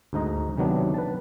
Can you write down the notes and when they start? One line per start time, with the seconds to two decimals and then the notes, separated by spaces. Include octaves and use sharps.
0.13 D2 G#2 D#4 D#5 A#5
0.58 C3 D#3 F#3 B3 D4
0.94 B4 A5